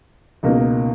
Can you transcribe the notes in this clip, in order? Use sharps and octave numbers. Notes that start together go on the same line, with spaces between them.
C#2 B2 A#3 D#4